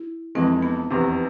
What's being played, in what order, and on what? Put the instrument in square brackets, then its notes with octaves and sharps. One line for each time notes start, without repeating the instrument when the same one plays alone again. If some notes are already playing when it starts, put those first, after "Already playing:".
Already playing: [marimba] E4
[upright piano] F1 F2 E3 G#3 [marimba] C4
[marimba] B3
[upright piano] F1 E2 C3